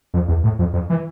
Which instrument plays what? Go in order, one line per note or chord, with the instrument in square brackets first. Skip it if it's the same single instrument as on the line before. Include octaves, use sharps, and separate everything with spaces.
[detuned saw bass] F2
E2
A2
F2
F2
E3